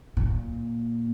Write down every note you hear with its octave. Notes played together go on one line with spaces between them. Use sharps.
A#2